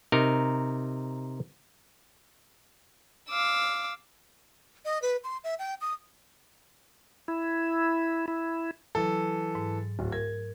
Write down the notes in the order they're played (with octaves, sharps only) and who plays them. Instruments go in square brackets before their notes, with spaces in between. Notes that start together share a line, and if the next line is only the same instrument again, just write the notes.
[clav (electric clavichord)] C3 D#4 A#4
[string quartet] F5 D6 E6
[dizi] D#5
B4
C6
E5
G5
D#6
[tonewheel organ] E4
E4
[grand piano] E3 A4 [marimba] F#3
[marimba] G#2
[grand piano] D1
[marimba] A#4 [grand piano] G#6